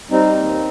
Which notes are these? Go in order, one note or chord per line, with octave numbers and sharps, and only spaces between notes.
G3 C4 D#4
D#2